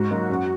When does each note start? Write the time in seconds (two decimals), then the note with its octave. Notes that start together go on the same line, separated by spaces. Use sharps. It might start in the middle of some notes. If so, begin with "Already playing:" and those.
Already playing: G#2 F#4
0.10 F#3 A#3 D#4
0.30 F#2